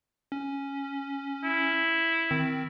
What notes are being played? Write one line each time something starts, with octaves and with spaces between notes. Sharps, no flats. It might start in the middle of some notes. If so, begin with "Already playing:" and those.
C#4
E4
D#3 C4